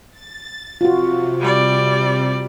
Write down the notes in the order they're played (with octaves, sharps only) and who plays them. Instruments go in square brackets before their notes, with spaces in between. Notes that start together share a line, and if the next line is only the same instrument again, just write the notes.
[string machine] A6
[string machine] C3 [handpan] F4 F#4
[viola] G3 D5